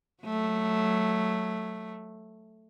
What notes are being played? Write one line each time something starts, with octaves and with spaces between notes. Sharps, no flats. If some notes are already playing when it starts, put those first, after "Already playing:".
F#3 A3